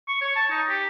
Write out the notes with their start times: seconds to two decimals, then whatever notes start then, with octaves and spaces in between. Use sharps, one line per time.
0.08 C#6
0.21 C#5
0.36 A5
0.51 D#4
0.69 G4